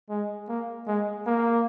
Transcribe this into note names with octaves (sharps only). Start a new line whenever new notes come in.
G#3
A#3
G#3
A#3